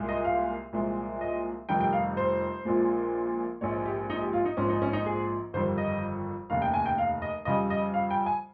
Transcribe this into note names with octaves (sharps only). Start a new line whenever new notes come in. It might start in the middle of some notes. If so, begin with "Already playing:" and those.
Already playing: C2 A#2 G#3
D#5
F5
C2 A#2 F3 G#3
D#5
F1 F2 D#3 G3 G5
G5
F5
C5
A#1 A#2 F3 G#3
A#1 G#2 F3 G#3 C#5
G4
D#4
G4
F4
D#4
A#1 G#2 F3 C#4
D#4
C#4
D#4
G#4
G1 F2 D#3 G3 C5
D#5
F1 D#2 C#3 F5
G5
G#5
G5
F5
D#5
F2 C#3 G3 D#5
D#5
F5
G5
G#5